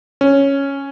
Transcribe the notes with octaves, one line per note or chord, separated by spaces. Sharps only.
C#4